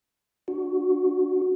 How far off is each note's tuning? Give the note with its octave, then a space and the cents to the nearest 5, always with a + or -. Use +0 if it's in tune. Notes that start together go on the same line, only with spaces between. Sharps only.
D4 +0 F#4 +0